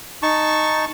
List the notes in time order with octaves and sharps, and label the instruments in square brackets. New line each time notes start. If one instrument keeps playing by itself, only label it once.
[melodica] D#4 A5 C#6